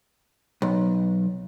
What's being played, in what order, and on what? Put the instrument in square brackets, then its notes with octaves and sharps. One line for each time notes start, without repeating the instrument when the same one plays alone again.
[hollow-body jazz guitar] B1